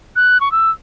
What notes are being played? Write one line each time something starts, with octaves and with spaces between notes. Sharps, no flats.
F#6
C#6
E6